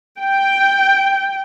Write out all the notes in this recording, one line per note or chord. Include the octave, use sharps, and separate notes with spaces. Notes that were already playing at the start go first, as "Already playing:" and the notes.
G5